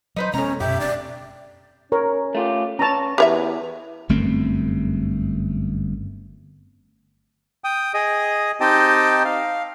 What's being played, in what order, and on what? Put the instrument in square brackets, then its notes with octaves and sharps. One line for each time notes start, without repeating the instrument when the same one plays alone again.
[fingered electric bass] F#3 [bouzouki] D#4 B4 C5
[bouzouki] A2 A#5 [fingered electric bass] C3 G#3 B3 [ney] C#4
[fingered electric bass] F#2 B2 [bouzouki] G4 [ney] E5
[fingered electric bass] F#1 C4 D4 [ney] D5
[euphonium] C#4 [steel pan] A#4 C#5
[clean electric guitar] A3 F4 G4
[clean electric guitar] C#4 B4 C#5 [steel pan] A5 A#5
[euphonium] E2 [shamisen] G4 C#5 E5 [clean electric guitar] B4
[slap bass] G1 F#2 A3 C4
[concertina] G5 D#6
G#4 D#5 D#6
C4 D#4 G4 D#5 G5 A5
F5